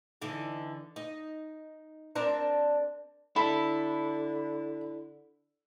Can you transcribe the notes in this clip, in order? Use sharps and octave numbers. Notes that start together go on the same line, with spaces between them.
D3 E3 D#4
D#4
C4 D4 A#4
D3 E4 A4 B5